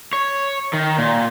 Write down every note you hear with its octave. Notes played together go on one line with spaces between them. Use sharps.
C#5
D#3
A#2